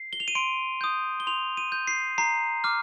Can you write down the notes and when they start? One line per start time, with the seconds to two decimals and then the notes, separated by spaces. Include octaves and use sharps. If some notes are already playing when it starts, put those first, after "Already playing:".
Already playing: C7
0.13 G7
0.20 F7
0.28 D#7
0.35 C6 D7
0.81 D#6 G6
1.20 G7
1.27 C6 F7
1.57 D#7
1.72 G6
1.87 C7
2.18 A#5 C7
2.64 D6 F6